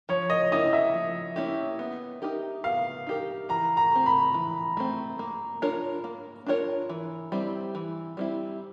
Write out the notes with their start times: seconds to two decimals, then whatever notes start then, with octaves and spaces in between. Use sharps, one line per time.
0.09 F3 C#5
0.30 D#5
0.52 A#3 C#4 E4 G4 D#5
0.73 E5
0.94 F3
1.36 A#3 C#4 E4 G4
1.79 B3
2.22 D#4 G4 A#4
2.64 B3 F5
3.07 D#4 G4 A#4
3.49 E3 A#5
3.77 A#5
3.91 A3 C4
4.06 B5
4.34 E3
4.77 A3 C4
5.19 A#3
5.62 D4 F4 A#4 C#5
6.04 A#3
6.46 D4 F4 A#4 C#5
6.89 E3
7.32 G3 C4 E4
7.75 E3
8.17 G3 C4 E4